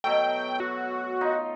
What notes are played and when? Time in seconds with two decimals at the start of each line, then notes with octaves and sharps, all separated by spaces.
0.04 B2 F#3 A3 G5
0.60 F#4
1.21 D#4 F4